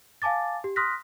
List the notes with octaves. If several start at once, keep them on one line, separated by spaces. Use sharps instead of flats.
F5 G#5 A5 D6 A6
G4
C6 D#6 F6 F#6 A#6 B6